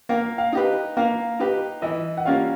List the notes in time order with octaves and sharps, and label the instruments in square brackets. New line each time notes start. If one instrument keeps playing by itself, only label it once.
[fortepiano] A#3 [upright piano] F5
[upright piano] F5
[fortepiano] D#4 G4 B4
[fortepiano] A#3 [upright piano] F5
[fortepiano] D#4 G4 B4
[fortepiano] E3 [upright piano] D#5
[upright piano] F#5
[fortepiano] G3 A#3 C#4 F4 [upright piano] F5